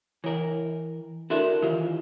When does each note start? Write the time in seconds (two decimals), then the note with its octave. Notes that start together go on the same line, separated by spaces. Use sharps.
0.24 E3 A#4 C#5
1.30 D4 E4 F#4 A4 A#4 E5
1.62 D#3 E3 F4 G4